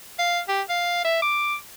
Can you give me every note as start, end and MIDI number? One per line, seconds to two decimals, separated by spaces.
0.19 0.40 77
0.49 0.62 67
0.69 1.00 77
1.05 1.21 76
1.22 1.55 86